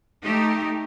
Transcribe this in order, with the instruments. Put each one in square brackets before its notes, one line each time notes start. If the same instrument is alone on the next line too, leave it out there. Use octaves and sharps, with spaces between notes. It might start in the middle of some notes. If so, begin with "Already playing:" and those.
[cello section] A3 D#4 G4